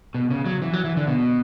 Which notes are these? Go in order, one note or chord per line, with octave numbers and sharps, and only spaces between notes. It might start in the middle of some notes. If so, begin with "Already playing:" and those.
B2
C#3
F#3
E3
F#3
E3
D3
B2